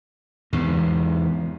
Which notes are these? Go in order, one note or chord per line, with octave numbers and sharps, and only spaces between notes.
E2 G#2 C3